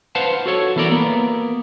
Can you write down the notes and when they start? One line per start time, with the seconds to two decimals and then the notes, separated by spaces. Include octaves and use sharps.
0.15 B4 C5 F5 F#5 A5
0.46 F#4 A4 C#5
0.76 E3 B3 A4 A#4 D5
0.91 A#3 B3